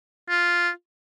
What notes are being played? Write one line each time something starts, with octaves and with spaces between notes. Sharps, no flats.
F4